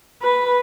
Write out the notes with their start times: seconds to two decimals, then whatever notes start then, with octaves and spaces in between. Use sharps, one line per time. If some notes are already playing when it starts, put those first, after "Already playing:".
0.22 B4